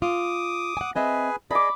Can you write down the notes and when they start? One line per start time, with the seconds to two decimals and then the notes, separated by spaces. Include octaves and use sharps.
0.02 F4 D6 D#6
0.77 F#5 G#5
0.96 C4 G#4 B4 D#5 E5 G#5
1.51 G#4 D5 D#5 B5 D6